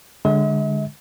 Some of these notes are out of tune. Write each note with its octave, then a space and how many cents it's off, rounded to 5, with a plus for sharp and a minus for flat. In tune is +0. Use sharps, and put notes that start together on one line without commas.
D3 -5 G#3 -15 E5 -45